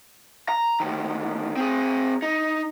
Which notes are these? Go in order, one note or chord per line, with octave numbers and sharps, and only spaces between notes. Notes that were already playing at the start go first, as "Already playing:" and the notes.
A#5
D2 D#3
C4 G#4
D#4